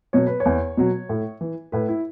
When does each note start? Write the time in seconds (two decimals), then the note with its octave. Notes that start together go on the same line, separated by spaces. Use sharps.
0.13 B2 F#3 C#5
0.27 B4
0.40 C#5
0.46 E2
0.77 B2 F#3
1.09 A2
1.41 E3
1.72 A2 B4
1.88 E4